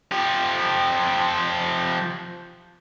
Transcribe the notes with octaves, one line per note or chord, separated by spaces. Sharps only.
F3 G4